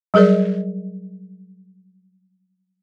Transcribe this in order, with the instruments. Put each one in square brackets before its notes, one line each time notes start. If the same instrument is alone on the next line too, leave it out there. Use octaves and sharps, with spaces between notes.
[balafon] F#3 G3 G#4 A#4 D5